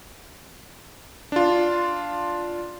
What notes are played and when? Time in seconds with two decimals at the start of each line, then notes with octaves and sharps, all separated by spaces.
1.32 D4 F4